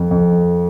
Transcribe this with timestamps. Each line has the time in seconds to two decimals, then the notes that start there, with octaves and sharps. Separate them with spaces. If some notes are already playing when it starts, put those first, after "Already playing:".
Already playing: F2
0.11 F2